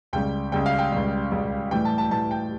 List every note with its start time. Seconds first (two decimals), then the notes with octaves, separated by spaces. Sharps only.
0.13 C#2 C#3 G3 G5
0.52 C#2 C#3 G3 G5
0.66 F5
0.79 G5
0.92 C#2 C#3 G3
1.32 C#2 C#3 G3
1.71 A2 E3 G3 G5
1.85 A5
1.98 A5
2.11 A2 E3 G3 A5
2.31 G5